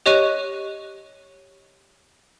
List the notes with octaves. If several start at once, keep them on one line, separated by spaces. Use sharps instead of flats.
G4 C#5 D#5 C#6 F#6 D#7